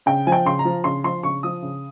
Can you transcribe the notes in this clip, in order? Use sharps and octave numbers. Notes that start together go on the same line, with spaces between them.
C#3 G5
F3 G#5
G5
C#3 C6
A#5
F3
C#3 C6
F3 C6
C#3 C#6
F3 D#6
C#3